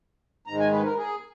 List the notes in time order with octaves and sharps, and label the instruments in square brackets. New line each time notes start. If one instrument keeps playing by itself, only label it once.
[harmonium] G#2 D#3 G#3 A#5
G#5
B4
A#4
G#4